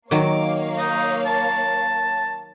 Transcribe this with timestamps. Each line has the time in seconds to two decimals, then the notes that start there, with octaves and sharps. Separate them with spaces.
0.11 D#3 F#3 A#3 C#5 F5 D6
0.78 D#4
1.26 A5